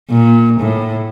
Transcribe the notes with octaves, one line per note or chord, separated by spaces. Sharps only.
A#2
A2